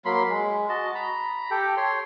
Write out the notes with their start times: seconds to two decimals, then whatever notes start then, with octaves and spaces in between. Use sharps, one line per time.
0.05 F#3 A#3 B5 C6
0.29 G#3
0.69 F#4 D#5 A5
0.95 A#5 B5
1.51 G4 A4 G5
1.77 C#5 C6